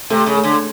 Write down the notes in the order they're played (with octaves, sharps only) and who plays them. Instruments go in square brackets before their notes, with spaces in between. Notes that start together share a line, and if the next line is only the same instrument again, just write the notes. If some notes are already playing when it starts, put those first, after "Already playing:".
[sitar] C3 [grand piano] A3
[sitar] C#3
[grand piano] A3
[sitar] D3